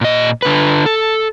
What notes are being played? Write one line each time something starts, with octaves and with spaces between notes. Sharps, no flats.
A#2 D#5
D3 B4
A4